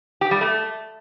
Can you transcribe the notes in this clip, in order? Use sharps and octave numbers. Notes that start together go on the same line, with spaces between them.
G4
G3
A3